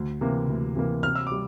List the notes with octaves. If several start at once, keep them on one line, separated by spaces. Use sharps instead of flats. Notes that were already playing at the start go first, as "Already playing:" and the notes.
Already playing: D2
C3 E3 A#3
D2
C3 E3 A#3
C3 F6
E6
G3 D6